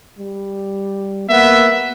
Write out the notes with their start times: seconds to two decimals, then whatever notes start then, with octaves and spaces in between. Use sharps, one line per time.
0.19 G3
1.29 A#3 B3 E5